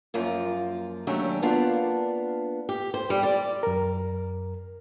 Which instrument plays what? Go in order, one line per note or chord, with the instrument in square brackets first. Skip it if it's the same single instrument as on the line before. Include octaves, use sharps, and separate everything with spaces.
[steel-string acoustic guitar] F#2 F3 A#3 F4
D#2 F#3 A3 C#4 D4 G4
A#3 B3 D4 F4 D5 F5
G4
C5
G3
D5
[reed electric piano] F#2 A#4